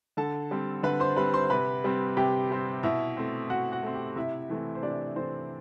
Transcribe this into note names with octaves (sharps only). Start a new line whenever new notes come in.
D3 A4 A5
G3 C4
D3 B4 B5
C5 C6
G3 C4 B4 B5
C5 C6
C3 B4 B5
G3 C4
C3 G4 G5
G3 C4
B2 E4 E5
A3 C4
B2 F#4 F#5
F#4 F#5
A3 C4
G4 G5
C3 E4 E5
E3 A3 C4
C5
C3 D4 D5
E3 A3 C4 C5